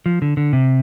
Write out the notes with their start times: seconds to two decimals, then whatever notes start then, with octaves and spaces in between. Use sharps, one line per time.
0.06 F3
0.22 D3
0.37 D3
0.53 C3